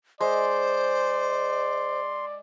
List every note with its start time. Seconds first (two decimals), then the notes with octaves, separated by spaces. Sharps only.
0.21 G#3 C5 D5 C6